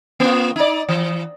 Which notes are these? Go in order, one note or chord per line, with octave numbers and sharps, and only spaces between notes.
A#3 F4
D#4 D5
E3